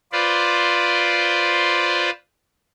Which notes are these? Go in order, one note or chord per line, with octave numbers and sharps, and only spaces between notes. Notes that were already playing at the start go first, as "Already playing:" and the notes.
F4 B4 C5 D5